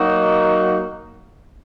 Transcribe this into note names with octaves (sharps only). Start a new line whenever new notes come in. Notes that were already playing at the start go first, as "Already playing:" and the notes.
Already playing: F#3 A#3 D#4 F#4